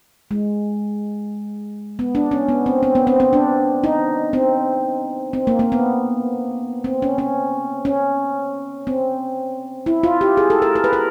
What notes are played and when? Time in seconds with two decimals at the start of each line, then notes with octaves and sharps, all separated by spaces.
0.31 G#3
1.99 B3
2.15 D4
2.31 C#4
2.49 B3
2.66 C4
2.83 C4
2.95 B3
3.07 C4
3.20 C4
3.33 D4
3.84 D#4
4.33 C4
5.33 C4
5.47 A#3
5.59 A#3
5.72 B3
6.84 C4
7.02 C#4
7.18 C#4
7.85 C#4
8.87 C4
9.86 E4
10.03 F4
10.21 G4
10.37 G#4
10.50 A4
10.62 A#4
10.76 A#4
10.84 B4
10.93 A#4